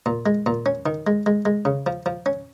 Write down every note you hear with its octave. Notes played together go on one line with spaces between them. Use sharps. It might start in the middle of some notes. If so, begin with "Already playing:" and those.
A#2
G#3
A#2
C#4
D#3
G#3
G#3
G#3
C#3
F3
F3
C#4